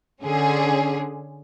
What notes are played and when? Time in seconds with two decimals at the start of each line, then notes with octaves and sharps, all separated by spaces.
0.24 D3 C#4 G#4